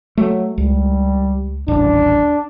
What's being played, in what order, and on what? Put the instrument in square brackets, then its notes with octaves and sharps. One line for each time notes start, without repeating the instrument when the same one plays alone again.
[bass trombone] F#3 [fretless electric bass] A3
[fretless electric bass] C#2 [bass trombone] G3
[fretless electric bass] D#1 A1 [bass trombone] D4